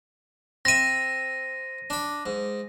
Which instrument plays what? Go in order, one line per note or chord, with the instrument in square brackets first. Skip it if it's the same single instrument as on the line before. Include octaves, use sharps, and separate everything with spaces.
[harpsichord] C4 E5 [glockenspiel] A#6 D#7
[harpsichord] D4 B5
G#2